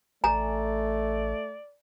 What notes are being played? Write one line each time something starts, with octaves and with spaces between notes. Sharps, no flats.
A1 A3 D5 G#5 A#5